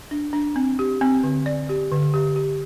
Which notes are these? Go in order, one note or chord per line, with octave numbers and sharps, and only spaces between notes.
D4
D4
C4
G4
C4
D3
D5
G4
D3
G4
G4